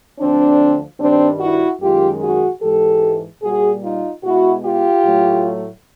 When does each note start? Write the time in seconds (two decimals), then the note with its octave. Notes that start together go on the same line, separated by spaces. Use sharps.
0.19 D2 D3 F3 C4 D4
0.99 G2 D#3 G3 C4 D4
1.40 E4 F#4
1.80 F#2 D#3 G#3 F4 G4
2.21 F#4 G#4
2.61 G#2 E3 G#3 G4 A4
3.43 A#2 G3 F#4 G#4
3.82 D#4 F4
4.23 B2 G#3 E4 F#4
4.64 F4 G4
5.03 A2 F#3 A3